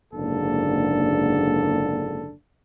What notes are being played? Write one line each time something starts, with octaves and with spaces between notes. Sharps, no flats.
F#1 G#2 D3 A#3 D4 A4